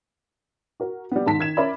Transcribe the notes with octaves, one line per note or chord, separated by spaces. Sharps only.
F#4 A#4
G3 B3
G#2 D#3 A5 B6
D#3 G#6 E7
C#4 A#4 D5 E5 B5